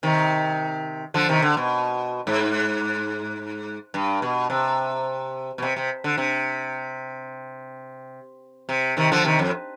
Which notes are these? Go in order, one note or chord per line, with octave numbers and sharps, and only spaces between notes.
C3 D#3
D3 F3
C3 D#3
D3
B2
G#2
G2
B2
C3
B2
C3
C3
D3
C3
C3
C3 D#3
D3 F3
C3 D#3
F2